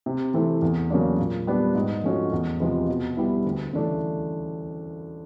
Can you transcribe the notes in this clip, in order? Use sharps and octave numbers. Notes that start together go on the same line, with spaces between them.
C3
E3 A3 C4 E4
E2
C#3 F#3 A#3 D4
A#2
G3 B3 D4
G#2
F3 A3 C#4 F#4
E2
C3 F3 G#3 B3
B2
G3 B3 E4
D2
C#3 E3 A3 D4